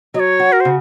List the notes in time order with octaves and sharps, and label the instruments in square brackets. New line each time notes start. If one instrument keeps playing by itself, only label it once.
[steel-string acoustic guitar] F#3 [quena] D#5
[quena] C#5
[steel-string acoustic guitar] F#4
[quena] A#4
C5
[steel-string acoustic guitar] C#3